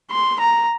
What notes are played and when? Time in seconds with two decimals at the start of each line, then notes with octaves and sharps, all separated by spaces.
0.11 C6
0.40 A#5